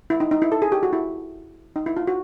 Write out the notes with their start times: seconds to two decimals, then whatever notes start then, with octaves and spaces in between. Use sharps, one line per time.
0.10 E4
0.20 D#4
0.31 D#4
0.42 E4
0.52 A4
0.62 G#4
0.72 G4
0.83 F#4
0.93 E4
1.76 D#4
1.86 E4
1.97 F4
2.07 F#4